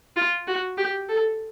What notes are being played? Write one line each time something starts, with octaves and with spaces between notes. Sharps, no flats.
F4
F#4
G4
A4